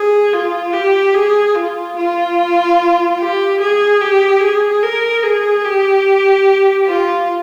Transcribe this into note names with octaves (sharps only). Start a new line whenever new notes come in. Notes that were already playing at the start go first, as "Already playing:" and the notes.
Already playing: G#4
F4
G4
G#4
F4
F4
G4
G#4
G4
G#4
A#4
G#4
G4
F4